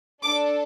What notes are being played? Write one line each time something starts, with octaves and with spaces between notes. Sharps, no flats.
D4 A4 D6